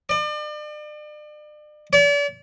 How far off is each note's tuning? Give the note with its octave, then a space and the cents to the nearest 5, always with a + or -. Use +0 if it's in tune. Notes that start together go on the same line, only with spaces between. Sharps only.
D5 +40
D5 -40